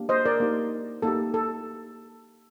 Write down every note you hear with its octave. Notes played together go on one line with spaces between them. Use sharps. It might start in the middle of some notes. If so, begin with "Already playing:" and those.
Already playing: A#3 D4 G4
C5 D#5
A#4 D5
A#3 D#4 G4
A#3 D#4 G4 A4
A4